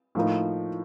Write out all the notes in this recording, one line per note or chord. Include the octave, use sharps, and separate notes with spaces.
A2 F3 A#3 D#4